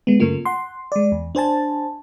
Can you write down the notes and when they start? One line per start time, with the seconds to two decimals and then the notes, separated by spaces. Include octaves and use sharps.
0.07 G#3 B3
0.20 F#2 C#3 A3 A#3 F4
0.45 F#5 C6
0.92 G#3 D5
1.12 E2
1.35 D4 C5 G#5 A5